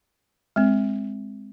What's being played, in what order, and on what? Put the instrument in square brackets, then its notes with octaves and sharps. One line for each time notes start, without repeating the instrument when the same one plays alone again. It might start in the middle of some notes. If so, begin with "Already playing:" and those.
[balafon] G#3 C4